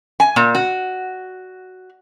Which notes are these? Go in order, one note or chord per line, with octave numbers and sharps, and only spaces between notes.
G#5
A#2
F#4